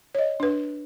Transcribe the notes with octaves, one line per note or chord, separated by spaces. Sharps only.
C#5 D#5
D4 B4